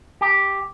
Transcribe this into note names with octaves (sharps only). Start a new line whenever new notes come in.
G4